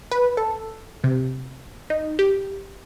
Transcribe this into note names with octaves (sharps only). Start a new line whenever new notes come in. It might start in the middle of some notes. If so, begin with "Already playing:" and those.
B4
A4
C3
D#4
G4